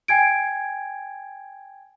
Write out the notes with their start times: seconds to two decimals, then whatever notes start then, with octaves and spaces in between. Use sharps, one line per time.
0.08 G5 G#5 G#6 D7